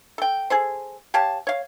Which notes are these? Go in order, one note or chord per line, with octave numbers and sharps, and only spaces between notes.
A4 G5
G#4 A4 C5
G4 C#5 F5 A5
C#5 F5